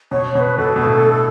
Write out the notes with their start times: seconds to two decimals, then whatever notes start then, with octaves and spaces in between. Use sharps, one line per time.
0.11 B2 C#5
0.35 B2 C#5
0.40 B4
0.58 B2 A4
0.76 B2
0.82 A2